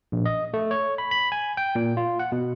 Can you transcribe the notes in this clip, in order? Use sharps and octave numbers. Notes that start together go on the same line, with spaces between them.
A#1
D#5
A3
C#5
B5
B5
G#5
G5
A#2
F4
F#5
B2